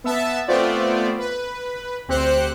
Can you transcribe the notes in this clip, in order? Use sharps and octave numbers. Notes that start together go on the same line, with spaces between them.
B3 E5 A5
A3 B3 C4 F4 C5 D5
B4
D2 C4 G4 C5 F#6 C#7